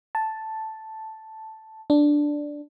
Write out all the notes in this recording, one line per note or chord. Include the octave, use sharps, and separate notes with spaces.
A5
D4